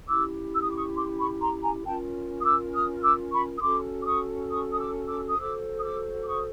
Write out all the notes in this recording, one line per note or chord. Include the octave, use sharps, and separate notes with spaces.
C#4 E4 G4 D6 E6
E6
D#6
D6
C#6 D#6
C6 D6
B5 C#6
A#5 C6
G#5 A#5
C#4 F4 A#4 G5 A5
D#6
D6 E6
D#6 F6
F6
D6 E6
B5 C#6
D#6
C#4 F#4 A4 C6 D6
D6
C#6 D#6
C#6 D#6
D#6
D6 E6
D6 E6
D#6
F#4 A4 C5 D6 E6
D#6
D6 E6
D6
C#6 D#6